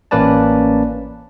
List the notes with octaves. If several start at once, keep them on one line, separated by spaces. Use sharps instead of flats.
A1 A#3 C#4 B4 D5 A5